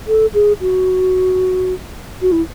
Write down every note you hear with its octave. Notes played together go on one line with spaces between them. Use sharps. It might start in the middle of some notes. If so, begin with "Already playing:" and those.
A4
G#4
F#4
F#4
E4